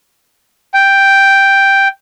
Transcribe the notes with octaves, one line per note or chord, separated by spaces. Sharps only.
G5